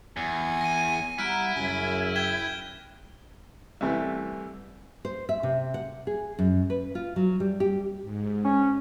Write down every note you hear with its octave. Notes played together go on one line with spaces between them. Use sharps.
E2 G#5
A#6 D#7
G3 E4 F#5 A#5 F6 F#6 D7
F#2 C#3 G#5
G5 G#6 E7 G7
C2 C3 E3 A3
C5
E5
C3
F#5
G#4
F#2
B4
F4
F#3
G3
G4
G#2
C#4